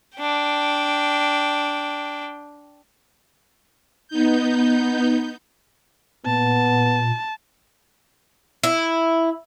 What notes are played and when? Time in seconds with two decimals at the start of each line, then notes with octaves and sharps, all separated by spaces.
0.18 D4 G5
4.08 B3 D#4 G6
6.26 A#2 B3 A5
8.64 E4